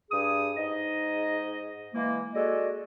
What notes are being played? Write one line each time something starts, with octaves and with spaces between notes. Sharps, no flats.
G2 G#4 D#6
G#2 D#4 D#5
E3 G#3 A#3
G#3 F#4 A4 D5 D#5